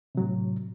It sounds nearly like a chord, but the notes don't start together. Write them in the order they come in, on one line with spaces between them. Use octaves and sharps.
C3 F#3 A2